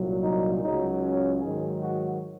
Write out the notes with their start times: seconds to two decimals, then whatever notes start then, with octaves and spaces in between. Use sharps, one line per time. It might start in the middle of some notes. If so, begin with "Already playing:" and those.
Already playing: C2 A#2 F#3
0.22 D#4
0.62 C#2 C#3 F#3 D#4
1.01 C#4
1.42 G#2 D#3 F#3 G#4
1.81 F#4